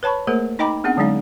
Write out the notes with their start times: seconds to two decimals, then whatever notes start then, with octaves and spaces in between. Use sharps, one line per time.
0.03 B4 C#5 A5 B5 C#6
0.27 A3 A#3 G#4 A#4 C5
0.59 D#4 D#5 G5 A#5 B5 D6
0.84 B3 C4 D4 G#4 F#5
0.97 D3 F#3 G#3 C#4 D#4 F5